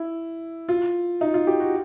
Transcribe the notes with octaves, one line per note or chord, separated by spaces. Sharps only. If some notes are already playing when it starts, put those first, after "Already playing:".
Already playing: E4
F4
D#4
F4
G4
F#4